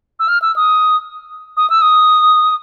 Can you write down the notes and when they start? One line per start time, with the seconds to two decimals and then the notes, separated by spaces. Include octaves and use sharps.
0.20 E6
0.28 F6
0.42 E6
0.56 D#6
1.57 D#6
1.70 E6
1.82 D#6